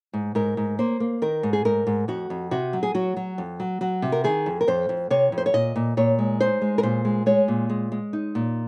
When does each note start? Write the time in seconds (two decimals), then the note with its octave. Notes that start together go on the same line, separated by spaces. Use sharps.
0.13 G#2
0.35 G#2 A#4
0.57 G#2
0.79 A#3 C5
1.00 A#3
1.22 D#3 A#4
1.43 G#2
1.53 G#4
1.65 G#2 A#4
1.87 G#2
2.08 F2 F#4
2.30 F2
2.51 C3 F#4
2.73 F#3
2.83 G#4
2.95 F#3 F#4
3.17 F#3
3.38 F2
3.60 F#3
3.81 F#3 F#4
4.02 C3
4.12 A#4
4.24 D#3 G#4
4.46 F2
4.61 A#4
4.67 F2 C5
4.89 F2
5.10 C3 C#5
5.32 F2
5.38 C5
5.46 C#5
5.54 A#2 D#5
5.76 A#2
5.97 A#2 C#5
6.19 G#3
6.40 D#4 C5
6.61 G#3
6.78 A#4
6.83 A#2 C5
7.05 G#3
7.26 G#3 C#5
7.48 A#2
7.69 G#3
7.92 G#3
8.13 D#4
8.35 A#2